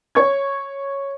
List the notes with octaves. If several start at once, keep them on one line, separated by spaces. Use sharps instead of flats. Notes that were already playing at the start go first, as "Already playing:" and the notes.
C#5 C#6 G#6